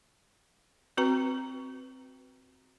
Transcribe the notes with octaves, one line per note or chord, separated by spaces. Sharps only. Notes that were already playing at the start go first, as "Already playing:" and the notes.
C4 F#4 B4 A#5